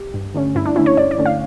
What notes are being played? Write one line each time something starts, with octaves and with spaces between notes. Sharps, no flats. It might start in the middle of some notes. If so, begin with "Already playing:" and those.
Already playing: G4
G2
D3 A3 C#4
G2 E4
D4
D3 A3 C#4 E4
C#5
G2 D5
D5
D3 A3 C#4
F5